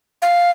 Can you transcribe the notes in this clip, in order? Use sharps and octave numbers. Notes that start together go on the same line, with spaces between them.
F5